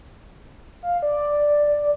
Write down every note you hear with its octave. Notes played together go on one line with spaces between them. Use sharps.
F5
D5